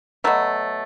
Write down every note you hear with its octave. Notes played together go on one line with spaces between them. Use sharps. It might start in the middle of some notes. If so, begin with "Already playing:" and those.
B2 F#3 A3